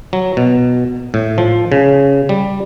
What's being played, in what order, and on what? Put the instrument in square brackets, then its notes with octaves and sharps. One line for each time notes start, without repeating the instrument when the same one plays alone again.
[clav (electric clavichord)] F#3
B2
A2
F3
C#3
G3